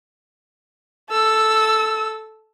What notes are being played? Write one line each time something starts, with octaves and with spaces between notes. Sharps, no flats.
A4 E6